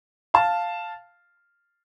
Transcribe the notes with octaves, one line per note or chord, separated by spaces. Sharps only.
F5 A5